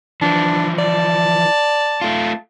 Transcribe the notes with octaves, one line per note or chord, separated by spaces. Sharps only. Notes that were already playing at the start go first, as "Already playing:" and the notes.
E3 F3 D4
D5 A5
A3 F4